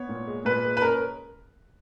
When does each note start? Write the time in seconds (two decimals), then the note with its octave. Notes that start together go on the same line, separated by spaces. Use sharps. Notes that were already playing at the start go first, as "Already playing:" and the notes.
Already playing: B3 C#5
0.09 A#2
0.27 G#3
0.45 A#2 B4
0.64 G#3
0.77 B4
0.82 C#4 A#4